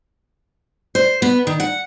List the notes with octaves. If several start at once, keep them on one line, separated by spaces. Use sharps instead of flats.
C5
B3
D#3
F#5